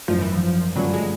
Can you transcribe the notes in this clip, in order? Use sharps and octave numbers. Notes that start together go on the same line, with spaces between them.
G#1 F#2 D#3 F3
E3
F3
G2 D3 F3 F#3 A3 C#4
G#3